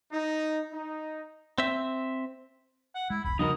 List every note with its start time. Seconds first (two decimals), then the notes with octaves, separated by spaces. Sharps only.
0.12 D#4
0.73 D#4
1.58 C4 E5
2.95 F#5
3.10 G#3 E4
3.24 E1 B1 B5
3.39 C#3 F3 G3 D#4 F#4 A#4 D#5